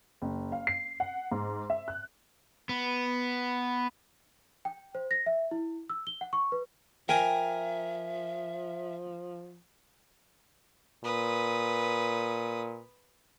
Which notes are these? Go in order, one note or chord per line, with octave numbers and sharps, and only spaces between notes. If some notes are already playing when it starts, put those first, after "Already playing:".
F#1
F5
C7
F#5
G#2
E5
F#6
B3
G5
C5
A#6
E5
E4
E6
G7
F#5
C#6
B4
F3 A#4 E5 G5 G#5 A#5
A#2 B4 D#6